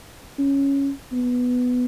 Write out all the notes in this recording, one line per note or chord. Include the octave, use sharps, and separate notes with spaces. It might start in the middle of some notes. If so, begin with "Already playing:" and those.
C#4
B3